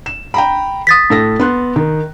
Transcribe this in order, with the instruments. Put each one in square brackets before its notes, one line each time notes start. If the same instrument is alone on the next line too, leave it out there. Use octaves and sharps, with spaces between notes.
[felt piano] E7
G5 A#5 B5
[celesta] D#6 A6 B6
[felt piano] A2 A4 A#6
B3 C6 F#6
D#3